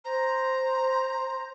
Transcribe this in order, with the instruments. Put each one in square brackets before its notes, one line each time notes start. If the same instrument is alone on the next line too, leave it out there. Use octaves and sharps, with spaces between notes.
[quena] C5 [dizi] A#5